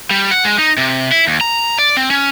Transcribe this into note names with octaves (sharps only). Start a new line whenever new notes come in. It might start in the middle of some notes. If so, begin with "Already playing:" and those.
G3
F#5
G#3
D#4
C3
E4
D#2
A#5
D5
C4
C#4